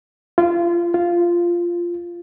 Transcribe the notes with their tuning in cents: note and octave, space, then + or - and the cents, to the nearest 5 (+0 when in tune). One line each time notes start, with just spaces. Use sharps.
F4 -25
F4 -10